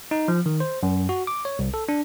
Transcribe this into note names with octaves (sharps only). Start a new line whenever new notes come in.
D#4
F3
D#3
C5
F#2
F#4
D6
C#5
C2
A4
D4